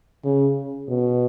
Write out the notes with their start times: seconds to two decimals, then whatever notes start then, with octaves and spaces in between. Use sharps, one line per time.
0.25 C#3
0.89 B2